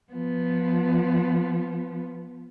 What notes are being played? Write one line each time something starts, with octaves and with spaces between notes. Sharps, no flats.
F3 B3